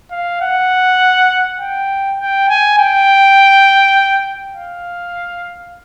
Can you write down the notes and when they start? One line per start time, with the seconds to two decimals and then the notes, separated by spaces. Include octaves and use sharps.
0.11 F5
0.42 F#5
1.59 G5
2.19 G5
2.49 G#5
2.78 G5
4.55 F5